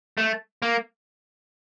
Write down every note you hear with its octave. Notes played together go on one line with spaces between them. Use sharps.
A3
A#3